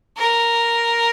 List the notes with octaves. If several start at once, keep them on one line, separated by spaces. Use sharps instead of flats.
A#4